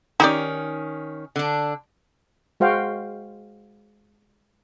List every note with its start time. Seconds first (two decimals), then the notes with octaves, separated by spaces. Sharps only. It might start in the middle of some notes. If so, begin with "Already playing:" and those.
0.20 D#3 C#4 D#4 G4 D5
1.36 D3 D4
2.60 G#3 F#4 C5 F5 G5